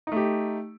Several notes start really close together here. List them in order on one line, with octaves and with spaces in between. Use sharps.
D#4 A3 G4